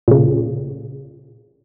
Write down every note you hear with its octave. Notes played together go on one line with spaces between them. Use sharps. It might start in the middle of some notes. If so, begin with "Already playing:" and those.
A#2 C#3